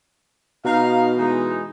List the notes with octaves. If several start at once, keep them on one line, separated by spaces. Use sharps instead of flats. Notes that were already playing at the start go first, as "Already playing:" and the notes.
B2 D#4 F5
E3 G#3 D#4